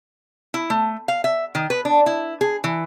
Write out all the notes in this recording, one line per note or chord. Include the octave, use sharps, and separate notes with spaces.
E4
A3
F5
E5
D#3
B4
D4
E4
G#4
E3